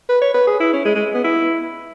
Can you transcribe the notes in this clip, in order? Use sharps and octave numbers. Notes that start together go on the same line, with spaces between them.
B4
C#5
B4
G#4
E4
C#4
G#3
G#3
B3
E4